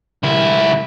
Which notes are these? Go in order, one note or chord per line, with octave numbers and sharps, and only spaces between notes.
C#2 E4